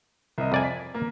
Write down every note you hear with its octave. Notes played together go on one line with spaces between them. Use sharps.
C2 D#5
F2 D5 G#5
B6
A#3